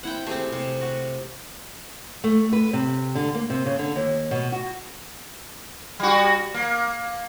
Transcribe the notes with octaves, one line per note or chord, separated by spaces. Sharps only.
C4 E4 F#5 G5
A3 C4 G4 G#4
C3
F#4
A3
B4
C3
D3
A#3
C3
C#3
D3
D#2
B2
F#4
G3 F#4
A#3